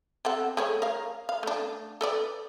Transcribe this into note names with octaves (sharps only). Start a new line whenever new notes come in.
C4 A4 F#5
A3 G#4 C#5
A#4 F5
F5
A3 D4
A4 B4 D5